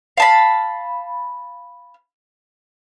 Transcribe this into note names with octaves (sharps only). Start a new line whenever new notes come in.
F5 A5 B5